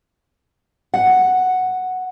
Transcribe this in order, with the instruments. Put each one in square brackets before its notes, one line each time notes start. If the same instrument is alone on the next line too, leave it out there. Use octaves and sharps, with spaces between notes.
[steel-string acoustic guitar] F#5